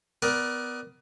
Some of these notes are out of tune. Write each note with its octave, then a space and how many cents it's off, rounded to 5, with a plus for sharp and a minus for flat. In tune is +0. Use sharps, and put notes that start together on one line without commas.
B3 +20 A#4 +30 D5 +0